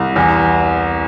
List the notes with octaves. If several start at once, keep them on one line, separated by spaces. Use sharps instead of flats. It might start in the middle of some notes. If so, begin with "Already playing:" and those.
Already playing: C2
E2